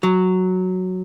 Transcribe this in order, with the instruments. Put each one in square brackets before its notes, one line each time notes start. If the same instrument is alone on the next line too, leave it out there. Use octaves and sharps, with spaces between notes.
[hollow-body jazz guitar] F#3